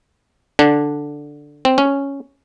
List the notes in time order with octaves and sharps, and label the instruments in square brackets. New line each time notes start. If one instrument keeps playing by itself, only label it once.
[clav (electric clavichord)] D3 D4
C4
C#4